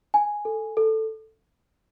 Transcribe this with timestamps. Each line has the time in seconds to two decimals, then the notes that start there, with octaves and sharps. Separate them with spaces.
0.14 G#5
0.45 A4
0.77 A4